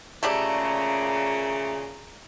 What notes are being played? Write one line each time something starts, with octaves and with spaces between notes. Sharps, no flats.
A#2 C#3 A3 G4 D5 A#5